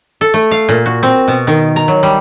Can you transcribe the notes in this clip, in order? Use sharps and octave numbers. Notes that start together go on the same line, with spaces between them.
A4
A3
F5
A#2
F#4
C4
B2
D#3
A#5
F#3
G3